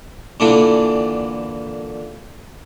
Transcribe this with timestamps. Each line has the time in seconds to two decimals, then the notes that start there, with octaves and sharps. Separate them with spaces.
0.40 A#2 D3 E3 D4